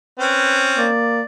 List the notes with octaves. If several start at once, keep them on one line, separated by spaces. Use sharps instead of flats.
C4 C#4 B4
A#3 D5